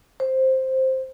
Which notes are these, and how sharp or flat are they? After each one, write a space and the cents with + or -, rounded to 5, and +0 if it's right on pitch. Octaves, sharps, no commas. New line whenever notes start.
C5 +5